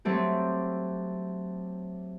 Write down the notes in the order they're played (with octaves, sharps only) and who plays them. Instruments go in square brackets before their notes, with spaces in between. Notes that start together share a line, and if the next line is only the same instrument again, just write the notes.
[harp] F#3 A3 C4 G4